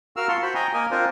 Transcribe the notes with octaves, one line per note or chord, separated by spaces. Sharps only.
F#4 A#4 F5 E6 F6
F4 A5 C6 C#6
F#4 C5 B5
D#5 G5 G#5 A#5
A#3 A#4 D#5 G#5
C4 D4 F4 A#4 C5